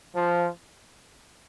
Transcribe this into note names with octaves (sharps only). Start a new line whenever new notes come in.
F3